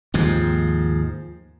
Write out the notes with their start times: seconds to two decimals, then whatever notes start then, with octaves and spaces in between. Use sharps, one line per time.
0.14 D#2 G#2 F3